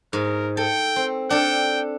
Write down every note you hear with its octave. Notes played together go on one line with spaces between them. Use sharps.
G#2 A#4
A4 G5
C4
D4 A4 G5